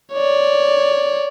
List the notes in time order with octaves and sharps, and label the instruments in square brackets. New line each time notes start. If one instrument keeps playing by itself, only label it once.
[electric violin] C#5 D5